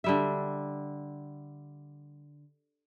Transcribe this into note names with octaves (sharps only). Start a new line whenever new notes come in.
D3 G3 E5